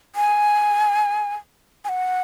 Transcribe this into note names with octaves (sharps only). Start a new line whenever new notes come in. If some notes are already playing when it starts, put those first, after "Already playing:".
G#5
G#5
F#5